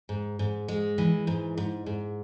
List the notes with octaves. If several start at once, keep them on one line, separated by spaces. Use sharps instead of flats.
G#2
G#2
G#3
E3
G#2
G#2
G#2